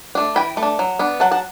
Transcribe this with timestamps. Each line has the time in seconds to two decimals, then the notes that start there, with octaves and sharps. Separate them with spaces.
0.15 A3 D4
0.36 E3 G5 B5
0.57 A3
0.63 D4
0.79 F#3
0.99 B3 D4
1.20 F#3 F#5 A5
1.31 F#5 A5